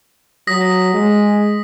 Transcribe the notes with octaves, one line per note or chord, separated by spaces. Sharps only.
F#3 D#6 A#6 B6
G#3